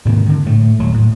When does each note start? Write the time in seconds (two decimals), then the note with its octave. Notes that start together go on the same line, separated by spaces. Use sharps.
0.05 G#2 C3 D#3 A#3
0.26 D3 D#3
0.46 A2 A3
0.79 D#1 F#3
0.94 A2